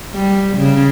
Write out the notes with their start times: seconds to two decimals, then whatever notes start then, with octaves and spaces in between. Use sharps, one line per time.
0.15 G3
0.57 C#3